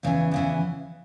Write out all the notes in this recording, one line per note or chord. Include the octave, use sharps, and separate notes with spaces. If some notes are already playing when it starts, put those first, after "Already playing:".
E2 C#3 E3
E2 C#3 E3